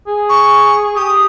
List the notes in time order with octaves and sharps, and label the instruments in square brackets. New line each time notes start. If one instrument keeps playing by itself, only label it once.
[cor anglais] G#4
[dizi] C#6
[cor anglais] G4 [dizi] D#6